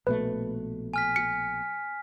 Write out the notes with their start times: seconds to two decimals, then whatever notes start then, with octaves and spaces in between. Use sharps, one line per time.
0.07 A#1 B2 A3 B4
0.94 G#5 F6 B6
1.16 C#7